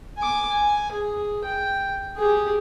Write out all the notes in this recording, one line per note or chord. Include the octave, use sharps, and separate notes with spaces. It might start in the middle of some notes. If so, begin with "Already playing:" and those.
G#5 D6
G#5
G#4
G5
G4 G#4